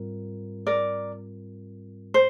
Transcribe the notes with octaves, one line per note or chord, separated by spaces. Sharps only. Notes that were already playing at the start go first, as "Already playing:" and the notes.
Already playing: G#2 G3 C4 F4 A#4
A#4 D5
C5